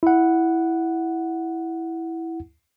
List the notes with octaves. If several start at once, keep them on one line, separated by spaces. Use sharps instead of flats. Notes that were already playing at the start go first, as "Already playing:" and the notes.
E4 F#5